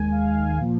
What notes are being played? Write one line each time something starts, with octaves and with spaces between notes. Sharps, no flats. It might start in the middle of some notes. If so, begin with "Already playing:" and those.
Already playing: D#2 D#3 G#3 G#5
F5
F5
G#5
A#2 F3 A#3